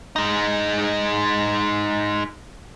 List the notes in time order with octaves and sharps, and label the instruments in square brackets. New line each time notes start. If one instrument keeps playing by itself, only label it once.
[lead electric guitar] G#3 D#4